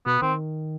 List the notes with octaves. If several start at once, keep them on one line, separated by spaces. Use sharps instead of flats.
B2 B3
D#3 C4